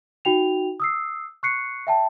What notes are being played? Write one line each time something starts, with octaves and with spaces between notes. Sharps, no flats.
D#4 F#4 G5 F7
D#6 E6 C7
C#6 F#6 C7 C#7
E5 G5 A5